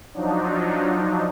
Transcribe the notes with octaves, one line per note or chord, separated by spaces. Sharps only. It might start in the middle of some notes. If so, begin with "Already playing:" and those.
F3 F#3 D4 D#4